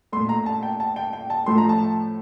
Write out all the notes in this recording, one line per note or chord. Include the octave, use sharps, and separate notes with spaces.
A#2 A3 C6
A#5
A5
G5
A5
G5
G5
A5
A2 F3 A3 C6
A#5
A5